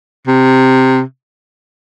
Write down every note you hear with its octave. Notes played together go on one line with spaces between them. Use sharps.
C3